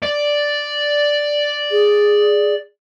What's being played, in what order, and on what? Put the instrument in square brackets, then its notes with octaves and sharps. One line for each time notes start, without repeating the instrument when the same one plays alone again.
[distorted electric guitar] D5
[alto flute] G#4